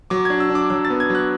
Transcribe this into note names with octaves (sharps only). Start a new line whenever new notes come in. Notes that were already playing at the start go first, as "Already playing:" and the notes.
F#3 D6
D4 G#6
E6
D4
D6
F#3 E6
A6
B3
G#6
F#3
F#6